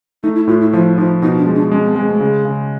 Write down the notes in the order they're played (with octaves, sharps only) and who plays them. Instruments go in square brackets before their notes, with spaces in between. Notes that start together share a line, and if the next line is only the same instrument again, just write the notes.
[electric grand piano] A3 [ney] D#4
[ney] E4
[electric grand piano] A2 [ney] F4
[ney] E4
[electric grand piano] F3 [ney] E4
[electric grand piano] F3 [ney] D#4
[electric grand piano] B2 [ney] D#4
[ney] D4
[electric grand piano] G#3
[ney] D4
[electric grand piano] G#3 [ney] C#4
[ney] C4
[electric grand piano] G#3 [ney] C4
[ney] A3
[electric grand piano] C#3
C#3